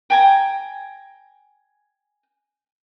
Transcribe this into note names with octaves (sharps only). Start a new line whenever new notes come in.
G5 G#5 A#5